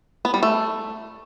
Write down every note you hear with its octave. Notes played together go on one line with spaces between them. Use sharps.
B3
G3
A3